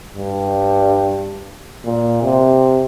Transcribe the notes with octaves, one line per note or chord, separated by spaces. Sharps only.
G2
A#2
C3